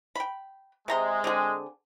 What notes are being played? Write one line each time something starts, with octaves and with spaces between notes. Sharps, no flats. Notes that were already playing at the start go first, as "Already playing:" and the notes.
G5 B5
C3 G#3 A#5 C6
D3 C4 G#4